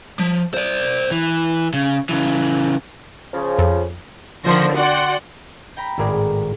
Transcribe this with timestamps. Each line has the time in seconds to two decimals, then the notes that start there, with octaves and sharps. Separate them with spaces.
0.19 F3
0.54 C5 D5
1.11 E3
1.73 C#3
2.09 C#3 E3
3.34 C#3 F3
3.58 F2
4.45 D3 D#3 F3 C5 C#6 A#6
4.76 F#4 D5 F#5 G5 C6
5.77 G5 A#5 B5
5.98 G#1 A2 G#4 A#4 D5